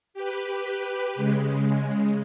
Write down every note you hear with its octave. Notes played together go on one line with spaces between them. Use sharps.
G4 B4
C#3 G#3